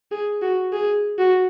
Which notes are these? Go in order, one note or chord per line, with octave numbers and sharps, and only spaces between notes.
G#4
F#4
G#4
F#4